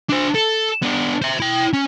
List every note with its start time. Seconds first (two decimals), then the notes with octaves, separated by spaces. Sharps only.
0.10 D4 C5
0.35 A4
0.83 B3 D4
1.22 C5 E5
1.40 E4 G5
1.73 C#4